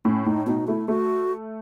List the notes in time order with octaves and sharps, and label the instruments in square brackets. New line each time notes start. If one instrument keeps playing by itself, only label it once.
[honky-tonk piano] A2 [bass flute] C#4
[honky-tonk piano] A2 [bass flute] D#4
[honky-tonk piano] B2 [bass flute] D#4
[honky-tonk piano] A3 [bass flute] E4
[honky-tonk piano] A3 [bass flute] F#4